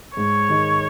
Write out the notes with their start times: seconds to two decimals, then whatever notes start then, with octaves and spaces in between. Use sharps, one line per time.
0.17 G#2 C#5
0.49 D#3 G#3 D#4